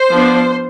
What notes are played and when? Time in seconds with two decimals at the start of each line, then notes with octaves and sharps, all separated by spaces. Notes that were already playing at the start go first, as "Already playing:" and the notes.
Already playing: C5
0.09 F3 B3 D4